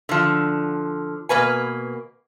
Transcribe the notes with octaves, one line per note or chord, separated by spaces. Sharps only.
D3 F3
B2 A#3 B4 G#5